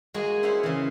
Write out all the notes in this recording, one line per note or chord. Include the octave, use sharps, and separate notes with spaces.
G#3 A#3 F#4 G#4 G#5
E4 F#4 C5 C#5 F5 F#5
C#3 E3